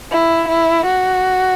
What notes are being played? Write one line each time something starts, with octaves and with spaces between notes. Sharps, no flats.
E4
E4
F#4